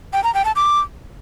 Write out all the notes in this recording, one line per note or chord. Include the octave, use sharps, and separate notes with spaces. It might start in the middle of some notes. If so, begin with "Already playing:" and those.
G5
A#5
G5
A5
D6